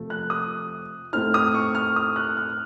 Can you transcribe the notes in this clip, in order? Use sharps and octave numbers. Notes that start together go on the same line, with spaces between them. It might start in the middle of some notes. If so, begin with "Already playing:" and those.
Already playing: F2 C3 F3 A3
F#6
D#6
A2 A3 C4 D#4 F6
D#6
C#6
F6
D#6
F#6
F6